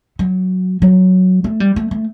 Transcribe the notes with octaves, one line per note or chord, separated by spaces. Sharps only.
F#3
F#3
A3
G3
A3
A3